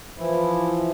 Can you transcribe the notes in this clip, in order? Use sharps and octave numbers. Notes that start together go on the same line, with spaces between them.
E3 F3 E4